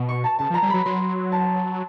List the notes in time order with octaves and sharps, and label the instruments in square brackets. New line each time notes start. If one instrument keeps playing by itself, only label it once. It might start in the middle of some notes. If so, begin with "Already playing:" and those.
Already playing: [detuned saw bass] B2
[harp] C#6
A5
[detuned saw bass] C#3 [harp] A5
[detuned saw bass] F3
[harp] A#5
[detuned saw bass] G3
[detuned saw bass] F#3 [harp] B5
[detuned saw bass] F#3 [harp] C6
[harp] A5